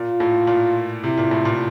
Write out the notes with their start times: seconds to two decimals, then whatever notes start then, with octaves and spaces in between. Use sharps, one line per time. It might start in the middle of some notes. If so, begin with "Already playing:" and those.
Already playing: A#2 F4
0.20 A2
0.47 A#2
1.04 C3 E4
1.18 A#2
1.31 A2
1.45 A#2